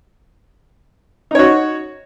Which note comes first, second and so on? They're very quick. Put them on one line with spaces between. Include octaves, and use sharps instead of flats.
D#4 C#5 F#4